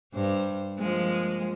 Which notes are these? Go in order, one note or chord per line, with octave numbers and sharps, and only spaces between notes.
G2 C5
F3 G#3 A#3